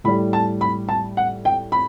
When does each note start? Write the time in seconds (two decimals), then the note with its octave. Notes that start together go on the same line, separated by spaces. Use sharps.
0.04 A2 G3 B5
0.33 A5
0.61 B5
0.89 A5
1.17 F#5
1.45 G5
1.72 B5